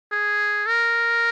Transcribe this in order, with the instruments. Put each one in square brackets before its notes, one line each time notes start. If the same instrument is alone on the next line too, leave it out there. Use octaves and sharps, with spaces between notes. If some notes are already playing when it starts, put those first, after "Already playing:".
[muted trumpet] G#4
A#4